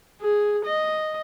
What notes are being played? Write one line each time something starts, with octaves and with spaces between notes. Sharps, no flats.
G#4
D#5